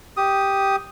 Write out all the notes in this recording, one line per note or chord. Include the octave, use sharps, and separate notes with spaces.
G4 D#6